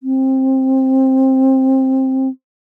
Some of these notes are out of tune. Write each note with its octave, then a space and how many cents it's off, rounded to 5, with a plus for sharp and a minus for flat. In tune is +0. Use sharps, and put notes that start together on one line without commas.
C4 +15